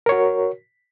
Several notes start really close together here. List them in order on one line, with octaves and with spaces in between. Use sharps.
A#4 C#5 F#4